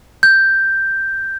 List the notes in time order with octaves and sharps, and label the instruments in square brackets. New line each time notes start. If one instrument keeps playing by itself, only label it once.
[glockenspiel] G6